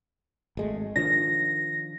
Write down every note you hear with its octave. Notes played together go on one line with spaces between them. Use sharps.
G#1 G#3 A3
D#3 F3 D4 A#6